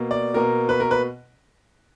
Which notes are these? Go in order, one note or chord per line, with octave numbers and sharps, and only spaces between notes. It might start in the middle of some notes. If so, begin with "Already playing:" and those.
Already playing: B2 A#3
D5
B2 A#3 A#4
B4
A#4
B4